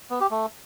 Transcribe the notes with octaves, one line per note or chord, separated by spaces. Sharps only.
B3
G4
A3